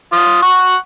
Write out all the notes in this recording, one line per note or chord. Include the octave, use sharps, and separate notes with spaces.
F4 D#6
F#5 C#6